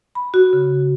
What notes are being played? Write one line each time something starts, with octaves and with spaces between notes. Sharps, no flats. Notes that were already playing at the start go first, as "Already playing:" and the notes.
B5
F#4
C#3